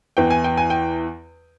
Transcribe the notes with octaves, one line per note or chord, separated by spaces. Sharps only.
E2 E3 G5
G#5
G5
G#5
G5